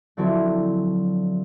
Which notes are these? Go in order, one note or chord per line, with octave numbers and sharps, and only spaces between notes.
D3 F3 F#3 C4 E4 A4